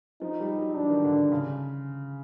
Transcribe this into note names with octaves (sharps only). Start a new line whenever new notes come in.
F3 D#4
G3
F#3
E3 D4
D#3
D3
D3
C#3